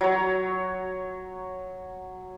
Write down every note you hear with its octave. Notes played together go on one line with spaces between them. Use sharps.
F#3 C#5